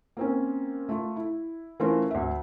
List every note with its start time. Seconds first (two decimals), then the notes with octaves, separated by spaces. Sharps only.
0.17 A#3 C4 C#4
0.89 A3 F4
1.16 E4
1.80 E3 A3 C#4 F4 A#4 C5
2.11 D2 E5